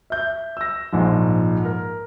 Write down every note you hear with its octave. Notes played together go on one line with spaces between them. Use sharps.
E5 G6
E6 A#6
A#1 G#2 F3
A#4